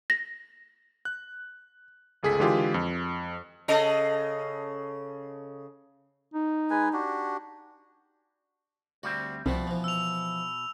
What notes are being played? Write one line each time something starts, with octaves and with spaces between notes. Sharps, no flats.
A#6
F#6
G1 C#2 G#4 A4 B6
D3 E3 G#3 F4 G4 G#4
F2
C#3 A4 D#5
D#4
G#3 B4 G#5
D4 F#4 G4
D2 G3 C4 F#4
C2 B2 F3 G3 A3
E3 F3
E6 F7